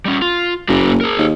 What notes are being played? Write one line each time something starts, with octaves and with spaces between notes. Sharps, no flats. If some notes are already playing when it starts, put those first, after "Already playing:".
G3 C#4
F4
F#1 A#3 F#4
G#4 A#4
D#2